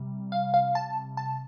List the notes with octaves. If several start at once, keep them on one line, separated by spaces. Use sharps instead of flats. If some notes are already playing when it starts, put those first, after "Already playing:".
Already playing: C3 G3
F5
F5
A5
A5